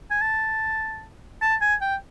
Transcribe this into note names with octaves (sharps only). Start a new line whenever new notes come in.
G#5
A5
A5
G#5
G5